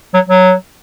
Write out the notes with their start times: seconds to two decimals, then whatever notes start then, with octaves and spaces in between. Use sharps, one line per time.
0.14 F#3
0.29 F#3